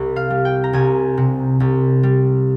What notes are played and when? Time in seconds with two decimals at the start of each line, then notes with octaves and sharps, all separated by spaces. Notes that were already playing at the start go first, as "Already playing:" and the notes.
Already playing: C2
0.16 F5
0.30 G3
0.45 G5
0.64 A#5
0.73 C2 G#5
1.17 C3
1.60 C2
2.03 G3